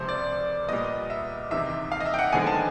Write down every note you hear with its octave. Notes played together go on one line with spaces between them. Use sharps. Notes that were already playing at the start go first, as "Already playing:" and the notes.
Already playing: C#2 C3 F3 C5
D5
A#2 G3 B3 D#5
E5
E2 C3 D#3 E5
F5
D#5
E5
G5
F#5
D#2 D3 F3 G#3 B3 G#5
A5